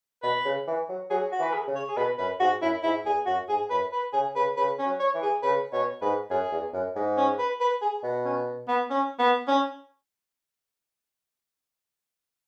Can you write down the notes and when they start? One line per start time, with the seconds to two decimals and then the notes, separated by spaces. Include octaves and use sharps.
0.23 B2 B4
0.45 C#3
0.67 E3
0.89 F#3
1.10 F#3 G#4
1.32 F#4
1.39 E3 B4
1.54 G#4
1.68 C#3
1.75 C#5
1.88 G#4
1.97 B2 B4
2.18 F#2 B4
2.40 G#2 F#4
2.62 F#2 E4
2.83 G#2 E4
3.05 E2 G#4
3.26 F#2 F#4
3.49 G#2 G#4
3.70 F#2 B4
3.92 B4
4.13 C#3 G#4
4.35 C#3 B4
4.57 C#3 B4
4.79 C#4
4.85 F#3
5.00 C#5
5.14 E3
5.22 G#4
5.43 C#3 B4
5.72 B2 C#5
6.01 G#2 B4
6.30 F#2 G#4
6.52 E2
6.73 F#2
6.95 G#2
7.17 C#4
7.39 B4
7.61 B4
7.81 G#4
8.03 B2
8.25 C#4
8.68 B3
8.90 C#4
9.19 B3
9.48 C#4